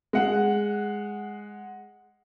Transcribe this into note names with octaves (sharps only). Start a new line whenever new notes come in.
G#3 F#5